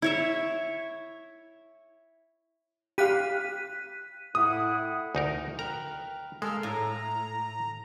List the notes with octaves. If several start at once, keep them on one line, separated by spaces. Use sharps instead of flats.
E4 C#5 E5
G4 F5 F#6 B6 D#7
A2 E4 F#5 D#6
D2 D#4 A#4
A#4 B4 G5 A#5
G#3 A4 A#4 E5 F5 E6 F6
A2 A#5